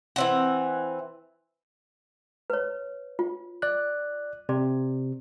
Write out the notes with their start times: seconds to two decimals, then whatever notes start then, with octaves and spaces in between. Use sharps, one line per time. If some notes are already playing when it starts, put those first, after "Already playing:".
0.16 E3 C4 F#5
2.50 B4 C#5
3.19 F4
3.62 D5 F#6
4.49 C3 D5